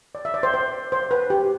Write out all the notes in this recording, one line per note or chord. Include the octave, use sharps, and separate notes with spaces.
D5
E5
D5
C5
C5
C5
B4
G4